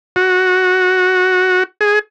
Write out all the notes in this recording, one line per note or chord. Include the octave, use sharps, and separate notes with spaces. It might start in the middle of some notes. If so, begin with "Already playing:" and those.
F#4
G#4